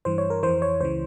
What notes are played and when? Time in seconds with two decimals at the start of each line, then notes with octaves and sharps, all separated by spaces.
0.05 G2 E3 C5
0.18 C#5
0.30 A#4
0.43 F2 E3 C5
0.62 C#5
0.81 C#2 C#3 E3 C5